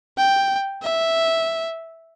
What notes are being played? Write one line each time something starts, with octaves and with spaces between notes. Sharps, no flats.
G5
E5